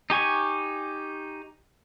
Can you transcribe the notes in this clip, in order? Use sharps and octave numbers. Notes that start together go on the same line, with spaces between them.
D#4 G4 G#5 C#6